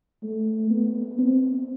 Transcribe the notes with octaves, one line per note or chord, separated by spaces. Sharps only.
A3
B3
C4